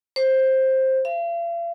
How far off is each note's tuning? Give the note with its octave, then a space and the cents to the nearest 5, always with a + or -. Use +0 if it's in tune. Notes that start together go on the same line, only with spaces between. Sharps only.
C5 +10
F5 -45